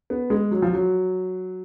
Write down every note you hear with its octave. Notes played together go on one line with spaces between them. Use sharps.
B3
G#3
F#3
F3
F#3